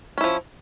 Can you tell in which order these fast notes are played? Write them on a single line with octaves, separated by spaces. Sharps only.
C#4 E4 F3